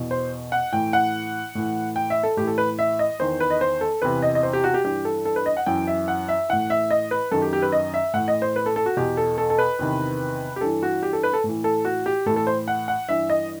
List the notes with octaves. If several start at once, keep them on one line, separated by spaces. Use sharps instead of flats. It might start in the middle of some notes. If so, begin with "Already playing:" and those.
Already playing: E2 B2
C5
F#5
A2 E3 G5
F#5
A2 E3
G5
E5
A4
A2 E3 G4
A4
B4
E5
D#5
E2 D#3 C5
B4
D#5
C5
A4
E2 C3 E3 B4
D#5
D#5
C5
G4
F#4
G4
G2 E3 G4
A4
A4
B4
D#5
F#5
F#2 E3 G5
E5
F#5
E5
A2 E3 F#5
E5
D#5
B4
F#2 D#3 A4
G4
G4
B4
D#5
E5
A2 E3 F#5
D#5
C5
B4
A4
A4
F#4
E2 B2 G4
A4
A4
A4
B4
E2 C3 D#3
G4
G2 E3 A4
F#4
G4
A4
B4
A4
A2
E3
A4
F#4
G4
A2 E3 A4
A4
C5
F#5
F#5
G2 E3 E5
D#5